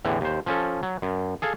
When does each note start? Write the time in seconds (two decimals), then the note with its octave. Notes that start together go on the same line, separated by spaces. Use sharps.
0.05 E2 A2 D3 E3
0.21 D#2 C5
0.46 F3 C#4 A4
0.83 F#3
1.02 F#2
1.42 G#4 A4 F5 G#5